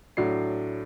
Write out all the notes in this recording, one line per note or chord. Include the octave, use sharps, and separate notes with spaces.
A2 F#3 D4 C7